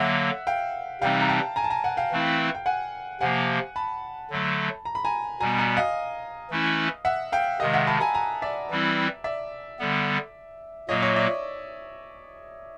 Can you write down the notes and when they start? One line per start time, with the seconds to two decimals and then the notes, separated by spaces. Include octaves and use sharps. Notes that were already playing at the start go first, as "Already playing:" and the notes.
Already playing: D3 F#3 A#3 E5 F#5
0.47 F5 G5
1.01 C3 E3 G3 C4 D#4 F5 G5
1.21 A#5
1.29 G5 A5
1.56 G#5 A#5
1.64 A5
1.70 G#5 A#5
1.84 F#5 G#5
1.97 F5 G5
2.12 E3 A3 C4 E4
2.55 G5
2.66 F#5 G#5
3.21 C3 F3 A#3 F#5 G#5
3.76 A5 B5
4.30 D3 F#3 A3
4.85 A#5
4.95 B5
5.05 G#5 A#5
5.40 B2 G3 B3 G#5 A#5
5.59 G#5 A#5
5.77 D#5 F5
6.50 E3 A3 C#4 E4
7.05 E5 F#5
7.32 F5 G5
7.60 C3 D#3 G#3 D#5 F5
7.74 E5 F#5
7.87 A5 B5
8.00 G#5 A#5
8.14 G#5 A#5
8.42 D5 E5
8.70 E3 G3 C4 E4
9.24 D5 E5
9.79 D3 G3 B3
10.89 A#2 F#3 A#3 C#5 D#5
11.02 C#5 D#5
11.16 D5 E5